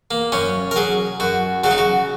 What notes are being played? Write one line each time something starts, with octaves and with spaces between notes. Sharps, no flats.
A#3
F#2 C#4
A#4
F#3 G#4
F#2 F#4
C#3 F#3 F#4
D#4
F#4